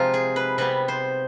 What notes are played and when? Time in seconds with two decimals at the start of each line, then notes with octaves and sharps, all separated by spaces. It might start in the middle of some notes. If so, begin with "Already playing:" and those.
Already playing: C3 F3 G#3 D#4 F4
0.14 G#4
0.36 B4
0.58 C3 G3 B3 B4
0.88 C5